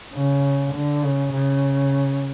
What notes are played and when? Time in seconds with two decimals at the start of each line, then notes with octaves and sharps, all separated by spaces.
0.14 C#3
0.74 D3
1.03 C#3
1.32 C#3